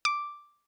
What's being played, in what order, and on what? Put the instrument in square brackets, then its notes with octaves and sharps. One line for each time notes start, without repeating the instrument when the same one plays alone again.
[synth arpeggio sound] D6